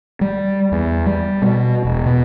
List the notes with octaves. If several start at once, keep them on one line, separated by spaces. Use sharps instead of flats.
G3
E2
G3
B2
E1
B2